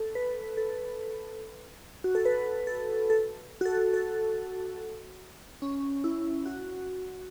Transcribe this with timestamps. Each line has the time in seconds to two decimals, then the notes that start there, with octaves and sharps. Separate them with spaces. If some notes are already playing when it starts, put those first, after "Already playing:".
Already playing: A4
0.15 B4
0.57 A4
2.04 F#4
2.15 A4
2.25 B4
2.67 A4
3.10 A4
3.61 F#4
3.65 A4
3.94 A4
5.62 C#4
6.04 E4
6.45 F#4